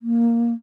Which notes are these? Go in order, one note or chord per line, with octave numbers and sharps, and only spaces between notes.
A#3